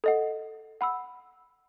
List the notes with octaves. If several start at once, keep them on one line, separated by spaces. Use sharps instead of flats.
A4 D#5 F#5
F#5 B5 E6